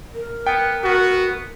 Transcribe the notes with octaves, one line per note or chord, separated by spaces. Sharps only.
A#4
B3 G5
B3 F#4